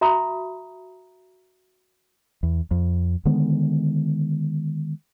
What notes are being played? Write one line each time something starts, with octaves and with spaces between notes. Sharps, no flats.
F#4 E5 A#5 B5 D#6
E2
F2
D3 D#3 G#3 B3